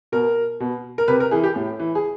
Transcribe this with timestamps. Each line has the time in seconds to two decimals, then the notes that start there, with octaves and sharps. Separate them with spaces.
0.12 B2 A#4
0.60 B2
0.98 A#4
1.08 C3 B4
1.20 A#4
1.31 E3 G#4
1.43 G4
1.56 A2
1.80 E3
1.95 G#4